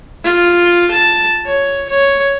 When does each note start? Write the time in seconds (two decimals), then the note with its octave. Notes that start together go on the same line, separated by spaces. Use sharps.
0.24 F4
0.91 A5
1.46 C#5
1.89 C#5